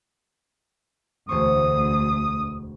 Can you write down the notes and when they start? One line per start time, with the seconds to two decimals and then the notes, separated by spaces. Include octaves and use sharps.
1.29 E1 D2 C5 C#6 D#6